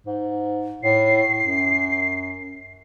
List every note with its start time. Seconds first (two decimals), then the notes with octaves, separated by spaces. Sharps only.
0.07 G#2
0.83 A2 C7
1.41 F#2